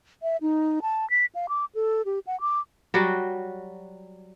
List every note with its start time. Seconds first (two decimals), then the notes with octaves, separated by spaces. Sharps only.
0.23 E5
0.42 D#4
0.82 A5
1.10 B6
1.35 F5
1.49 D6
1.75 A4
2.06 G4
2.27 F#5
2.41 D6
2.94 F#3 G3 F#4